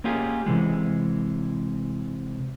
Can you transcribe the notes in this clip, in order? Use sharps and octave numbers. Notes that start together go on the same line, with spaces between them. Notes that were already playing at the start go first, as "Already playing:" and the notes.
A#3 C#4 F4 G4 G#4
C3 E3 G#3